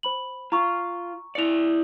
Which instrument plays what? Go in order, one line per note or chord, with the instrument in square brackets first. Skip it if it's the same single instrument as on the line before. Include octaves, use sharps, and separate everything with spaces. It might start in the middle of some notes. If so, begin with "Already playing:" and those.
[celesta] C5 B5 F#7
[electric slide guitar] F4 [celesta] A#5 C#6
[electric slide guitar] E4 D5 [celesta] C#7 F7